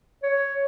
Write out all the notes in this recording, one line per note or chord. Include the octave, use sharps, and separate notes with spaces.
C#5